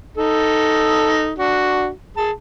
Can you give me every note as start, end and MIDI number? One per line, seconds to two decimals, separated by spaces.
0.17 1.31 63
0.17 1.31 69
1.39 1.89 62
1.39 1.89 66
2.17 2.31 68
2.17 2.31 81